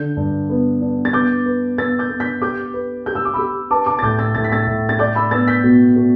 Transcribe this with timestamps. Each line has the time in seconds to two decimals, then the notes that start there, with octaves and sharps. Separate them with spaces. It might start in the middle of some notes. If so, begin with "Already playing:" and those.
Already playing: D3 G6
0.17 G2
0.50 B3
0.81 D4
1.05 A6
1.13 B3 D6 G6
1.46 B4
1.78 B3 E6 A6
1.99 D6 G6
2.09 B3
2.20 G6 B6
2.42 G4 D6 G6
2.74 B4
3.06 G4 G6
3.15 E6
3.25 D6
3.34 G4 B5 E6
3.71 B4 A5 D6
3.86 A5 D6
3.99 A6
4.02 A2 D6 G6
4.19 E6 A6
4.35 A2 A6
4.44 B6
4.52 E6 A6
4.67 A2
4.89 A6
4.99 D5 D6 G6
5.15 B5 E6
5.31 B3 E6 A6
5.48 G6 B6
5.64 B2
5.96 B2